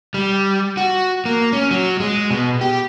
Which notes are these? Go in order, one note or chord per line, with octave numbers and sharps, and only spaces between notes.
G3
F#4
A#3
C#4
F#3
G#3
B2
G4